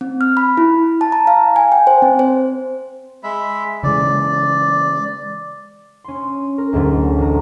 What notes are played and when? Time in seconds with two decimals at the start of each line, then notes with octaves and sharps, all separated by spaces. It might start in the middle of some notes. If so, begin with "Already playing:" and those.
0.01 C4
0.21 F6
0.37 B5
0.57 E4
1.01 A5
1.12 A#5
1.27 F5
1.56 G#5
1.72 G5
1.87 C5
2.02 C4
2.19 C5
3.23 G#3 E5 B5
3.83 C#3 E3 G#3 D5
6.04 C#4 C6
6.58 A#4
6.73 D2 G#2 F#3 A3
7.18 A1 A#5